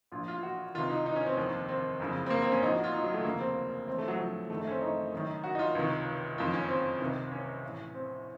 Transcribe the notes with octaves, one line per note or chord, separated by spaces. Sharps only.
A#1 A#2 F4
F4
F4
F#4
C#2 C3 D#3 F4
D#4
D#4
C#4
C4
F1 D#2 D#3
C4
F#1 F2 C#3
C4
A#3
C4
C#4
A#1 A#2 D#4
F#4
F4
D#4
F#3
A3
F1 D#2 C#3 A#3
C4
A1 A2 C4
A3
F#3
F3
F#3
F#1 F#2 D#3 A3
A3
C#4
C4
D#4
F#1 F#2 D#3
F#4
D#4
F4
C#2 C3 D#3
F#1 F2 D#3 F4
C#4
C4
C#2 C3 D#3
C#4
A1 A2
C4